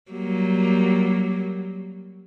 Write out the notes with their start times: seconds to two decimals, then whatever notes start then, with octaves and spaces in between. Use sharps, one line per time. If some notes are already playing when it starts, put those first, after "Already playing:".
0.11 F#3 G3 A#3